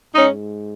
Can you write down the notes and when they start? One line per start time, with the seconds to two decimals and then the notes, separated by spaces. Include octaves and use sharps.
0.13 G#2 C#4 D#4